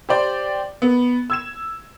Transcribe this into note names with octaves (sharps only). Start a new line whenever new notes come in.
G4 C5 D5 G5
B3
E6 G#6 E7